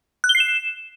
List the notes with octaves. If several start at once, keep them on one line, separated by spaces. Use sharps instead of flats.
F#6
G7
C7
E7